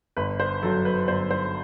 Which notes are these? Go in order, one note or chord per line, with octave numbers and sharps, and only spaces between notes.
G1 B4
C5
F#2 F#3 A4
B4
G1 C5
C5